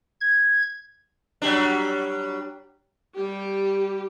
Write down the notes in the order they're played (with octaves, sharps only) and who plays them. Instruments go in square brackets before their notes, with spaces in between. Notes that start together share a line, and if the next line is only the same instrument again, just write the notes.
[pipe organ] G#6
[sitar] F#3 G3 D4
[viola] G3 G4